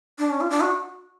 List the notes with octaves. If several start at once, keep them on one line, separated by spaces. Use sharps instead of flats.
D4
C#4
F4
D4
F#4